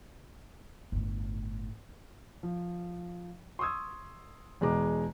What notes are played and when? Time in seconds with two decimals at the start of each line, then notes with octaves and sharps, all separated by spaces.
0.92 G1 A2
2.43 F3
3.59 C6 C#6 D#6 E6 G#6
4.61 E2 B2 G#3 B4 A#5 D6